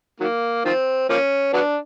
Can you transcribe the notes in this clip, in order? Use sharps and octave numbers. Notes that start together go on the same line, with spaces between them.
D#3 F#3 A#3
D#3 F3 C4
F3 A#3 C#4
F#3 B3 D4